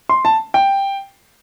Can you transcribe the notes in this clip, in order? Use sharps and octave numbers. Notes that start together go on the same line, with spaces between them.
C6
A5
G5